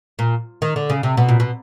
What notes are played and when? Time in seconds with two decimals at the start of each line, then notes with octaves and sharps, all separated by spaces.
0.19 A#2
0.62 D#3
0.76 D3
0.90 C#3
1.03 C3
1.17 B2
1.29 A#2
1.40 B2